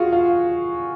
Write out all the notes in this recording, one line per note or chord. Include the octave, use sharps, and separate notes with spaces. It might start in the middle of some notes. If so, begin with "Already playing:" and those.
Already playing: F4 F#4 G#4
F4